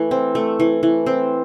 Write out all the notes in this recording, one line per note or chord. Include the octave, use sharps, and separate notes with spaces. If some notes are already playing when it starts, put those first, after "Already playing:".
Already playing: E3 A3 B4
C4
A3
E3
E3
C4